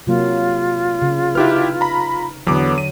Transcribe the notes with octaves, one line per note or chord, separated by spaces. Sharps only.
C3 F#3 A#3 F4
C#3
D#4 E4 G4 B4 F6
A#5 B5
E2 D3 F#3 B3 D6
D#7